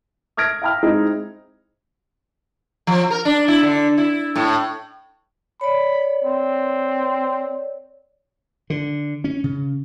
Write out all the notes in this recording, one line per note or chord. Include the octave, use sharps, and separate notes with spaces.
D#6 F6 G#6 A#6 D7
F5 G5 B5 F6
G#3 C4 D#4 E4
F3
A#4
D4
E4
D3
E4
A2
C#5 D5 B5
C4
D3
C#4
C#3